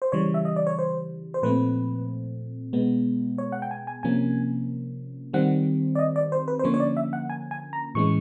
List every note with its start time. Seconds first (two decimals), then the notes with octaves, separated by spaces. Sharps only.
0.02 C5
0.12 C#3 E3 G3 C#5
0.34 E5
0.45 D#5
0.56 D5
0.67 C#5
0.79 C5
1.34 C5
1.43 A#2 F3 A3 C4 B4
2.73 B2 G#3 B3
3.38 C#5
3.52 F#5
3.62 G5
3.71 G#5
3.87 G#5
4.03 C3 F3 A#3 C#4 G#5
5.33 D#3 G3 C4 F#5
5.95 D5
5.99 D#5
6.16 D5
6.32 C5
6.48 B4
6.59 C5
6.64 D3 F3 A#3 C#4 C#5
6.74 C#5
6.80 D5
6.97 E5
7.13 F#5
7.30 G#5
7.51 G#5
7.73 A#5
7.95 A2 E3 G#3 C#4 C#6